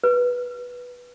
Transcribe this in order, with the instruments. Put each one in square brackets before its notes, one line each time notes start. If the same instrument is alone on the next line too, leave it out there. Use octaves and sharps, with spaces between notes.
[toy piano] B4